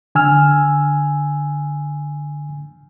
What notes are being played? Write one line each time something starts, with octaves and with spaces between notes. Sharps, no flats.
D3 G#5 E6 F6